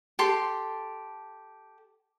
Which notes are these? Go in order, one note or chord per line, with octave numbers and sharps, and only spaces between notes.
G4 A4 C6